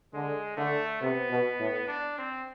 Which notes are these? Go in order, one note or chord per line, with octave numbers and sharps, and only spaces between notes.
D3 G#3
D3 A3
C3 B3
B2
A2
D4
C4